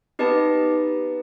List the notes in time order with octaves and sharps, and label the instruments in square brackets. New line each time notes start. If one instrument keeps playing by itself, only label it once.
[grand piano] B3 [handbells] D#4 G4 D#5 A5